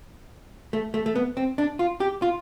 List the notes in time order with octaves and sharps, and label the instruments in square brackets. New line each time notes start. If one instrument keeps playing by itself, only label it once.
[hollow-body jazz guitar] A3
A3
A3
B3
C4
D4
F4
G4
F4